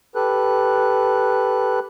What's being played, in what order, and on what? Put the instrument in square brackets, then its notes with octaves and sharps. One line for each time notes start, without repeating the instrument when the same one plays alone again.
[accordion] G4 A4 B4 F#6